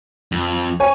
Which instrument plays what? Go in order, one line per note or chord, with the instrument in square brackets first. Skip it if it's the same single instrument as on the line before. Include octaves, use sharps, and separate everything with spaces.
[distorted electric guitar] F2
[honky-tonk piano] C#5 G#5